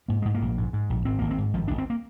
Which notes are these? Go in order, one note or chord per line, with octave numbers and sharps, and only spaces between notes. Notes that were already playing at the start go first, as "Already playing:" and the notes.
G#2 A#3
G#2 G#3
A#3
A#1
G#2
G#2
A#1
G#1 C4
G#1 A#3
C4
G#2
G#1 F3
G#1 D4
C4
A#3